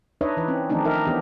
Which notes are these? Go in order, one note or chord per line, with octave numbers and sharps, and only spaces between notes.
D4 D#4 B4 C#5 D#5 E5
E3 B4
C4 C#4
D#3 F3 A3 C4 D4 D#4
D#4 A#4 E5
E3 B3 D4 G4